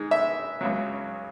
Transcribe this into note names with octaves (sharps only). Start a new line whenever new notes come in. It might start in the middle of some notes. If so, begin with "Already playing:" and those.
Already playing: G#2 D#3 G#3
E5
C#2 C#3 F#3